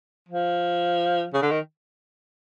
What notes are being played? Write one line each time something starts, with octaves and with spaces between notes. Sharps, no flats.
F3
C#3
D3
D#3